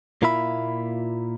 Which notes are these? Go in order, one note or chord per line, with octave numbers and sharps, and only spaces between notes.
A#2 A#3 E4 F4 E5 B5